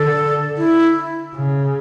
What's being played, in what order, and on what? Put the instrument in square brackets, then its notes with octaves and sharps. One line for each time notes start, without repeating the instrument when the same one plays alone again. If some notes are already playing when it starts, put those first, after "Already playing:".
Already playing: [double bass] D3 [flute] A4
[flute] E4
[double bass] C#3